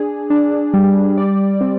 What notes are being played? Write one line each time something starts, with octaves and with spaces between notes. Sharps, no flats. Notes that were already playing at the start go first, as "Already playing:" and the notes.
Already playing: D4 G#4
D4
G3
D5
C4